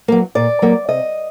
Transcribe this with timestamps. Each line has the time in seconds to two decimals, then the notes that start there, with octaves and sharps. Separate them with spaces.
0.08 F#3 A#3
0.35 A#2 D5
0.62 F#3 A#3
0.89 C3 D#5